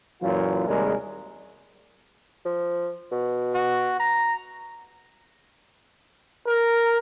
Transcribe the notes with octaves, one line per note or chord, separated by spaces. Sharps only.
F#2 A#2 E3 F#3 F4
D#2 C3 G3 G#3 G#4 A#4
F3
B2
F#4
A#5
A#4